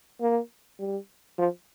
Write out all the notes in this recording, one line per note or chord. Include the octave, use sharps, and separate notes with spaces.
A#3
G3
F3